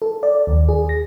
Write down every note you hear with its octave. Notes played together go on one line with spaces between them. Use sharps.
A4
D5
D#2
G#4
A#6